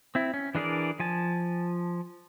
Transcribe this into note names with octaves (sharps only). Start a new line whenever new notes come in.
C4 E4
C#4
E3 D4 G#4 A#4 D5
F3 G#5 A5